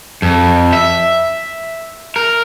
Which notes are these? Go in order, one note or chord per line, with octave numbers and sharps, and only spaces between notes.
F2
E5
A#4